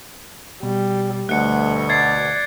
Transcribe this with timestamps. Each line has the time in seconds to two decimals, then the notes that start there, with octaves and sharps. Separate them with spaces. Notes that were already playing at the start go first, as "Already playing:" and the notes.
0.63 B2 G3
1.29 D2 B2 G3 A3 F#5 F#6 C#7
1.89 D5 E5 G#6 A6 C7